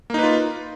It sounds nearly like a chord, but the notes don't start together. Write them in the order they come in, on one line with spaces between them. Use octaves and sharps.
A#3 D#4 B4 F4